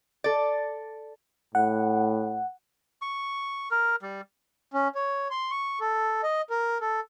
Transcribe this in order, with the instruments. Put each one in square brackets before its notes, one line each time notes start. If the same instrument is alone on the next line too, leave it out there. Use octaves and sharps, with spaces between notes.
[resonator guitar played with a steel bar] A4 D5
[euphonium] A2 [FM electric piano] F#5
[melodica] C#6
A#4
G3
[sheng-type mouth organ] C#4
C#5
C6
C#6
A4
D#5
A#4
A4